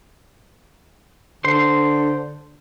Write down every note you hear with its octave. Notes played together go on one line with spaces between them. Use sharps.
D3 C5 C6